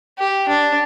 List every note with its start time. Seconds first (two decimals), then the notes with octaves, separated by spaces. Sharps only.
0.19 G4
0.48 D4